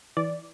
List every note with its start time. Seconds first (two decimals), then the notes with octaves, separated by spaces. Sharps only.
0.17 E3 D5